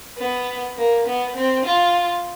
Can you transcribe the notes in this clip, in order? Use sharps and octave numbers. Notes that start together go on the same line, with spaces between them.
B3
A#3
B3
C4
F4